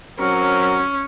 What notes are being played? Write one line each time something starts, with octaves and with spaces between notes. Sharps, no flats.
F#3 C4 C#4 A#4